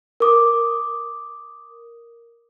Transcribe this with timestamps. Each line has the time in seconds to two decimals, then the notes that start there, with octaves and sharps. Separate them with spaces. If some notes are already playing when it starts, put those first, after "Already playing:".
0.20 A#4 D6 D#6